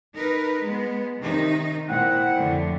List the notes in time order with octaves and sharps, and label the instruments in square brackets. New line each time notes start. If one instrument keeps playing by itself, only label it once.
[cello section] D#4 A#4 B4
G#3 B3
C3 D#3 D#4
[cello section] A#2 [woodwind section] C4 E4 F#5
[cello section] F2 A2 D3